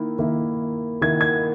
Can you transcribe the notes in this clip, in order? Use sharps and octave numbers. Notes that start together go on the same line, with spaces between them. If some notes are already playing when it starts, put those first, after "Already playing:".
Already playing: D#3 A#3 E4
D#3 A#3 E4
D#3 A#3 E4 G#6
G#6